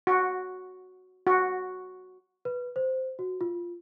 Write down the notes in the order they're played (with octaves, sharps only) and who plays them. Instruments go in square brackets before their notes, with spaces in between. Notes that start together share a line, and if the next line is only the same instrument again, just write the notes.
[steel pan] F#4
F#4
[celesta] B4
C5
F#4
F4